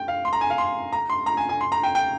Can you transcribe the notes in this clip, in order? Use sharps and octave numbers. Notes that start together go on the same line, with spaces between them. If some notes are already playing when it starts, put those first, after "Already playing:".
Already playing: G5
F5
C6
A#5
G#5
F5
C6
A#5
C6
A#5
G#5
G#5
C6
A#5
G5
G5